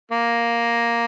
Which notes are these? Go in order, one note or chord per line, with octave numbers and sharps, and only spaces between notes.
A#3